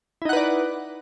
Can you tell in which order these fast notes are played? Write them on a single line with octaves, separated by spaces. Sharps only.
E4 D#4 F#5 B4 D5